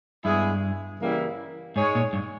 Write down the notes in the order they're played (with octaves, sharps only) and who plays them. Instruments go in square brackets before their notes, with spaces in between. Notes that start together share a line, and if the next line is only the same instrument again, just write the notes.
[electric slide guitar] G2 [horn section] G#3 B3 E4 G#4
[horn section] C#3 E3 G3 A#3 E4
[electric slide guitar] G#2 [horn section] G#3 D#4 G#4 C#5
[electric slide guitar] A#2
G2